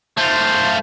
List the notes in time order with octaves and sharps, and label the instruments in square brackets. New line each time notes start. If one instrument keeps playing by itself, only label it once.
[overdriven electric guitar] A3 F4 [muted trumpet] C5